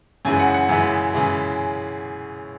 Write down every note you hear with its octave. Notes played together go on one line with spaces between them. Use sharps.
F#2 C#3 E3 G#3 G#5
F#5
F#5
F#2 C#3 E3 G#3
F#2 C#3 E3 G#3